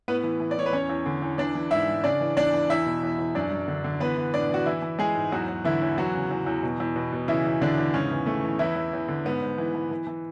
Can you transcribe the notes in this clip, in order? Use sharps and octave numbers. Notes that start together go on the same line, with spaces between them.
A2 B3 B4
E3
E3
D5
A2 C#5
B4
E2 C#4 C#5
E2
D3
E2
E3 D4 D5
E3
G#2 E4 E5
G#2
C#3 D4 D5
E3
E2 D4 D5
E3
E2 E4 E5
B2
E2
E2
F#2 D4 D5
F#2
D3
D3
E3 B3 B4
E3
A2 D4 D5
E3 F#4
E3 E4
E3
E3 G#3 G#4
G#2
E2 F#3 F#4
E2
D3 E3 E4
E2
E3 F#3 F#4
C#3
E2
E2
B2
E2
B2
B2
C#3 E3 E4
E2
E2 D3 D4
E2
G#2 C#3 C#4
E3
E3 A3
E3
E2 E3 E4
E2
E2
D3
G#2 B3
G#2
E3
E3
E3
E3